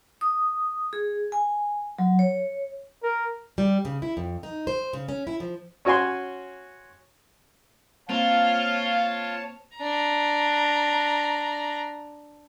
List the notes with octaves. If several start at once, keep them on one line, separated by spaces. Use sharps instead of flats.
D#6
G#4
G#5
F#3
C#5
A#4
G3
C#3
E4
F2
D#4
C5
C#3
C#4
E4
F3
C#4 F#4 C#5 G#5 C6
A#3 C4 F4 C#5 F5 A5
D4 A#5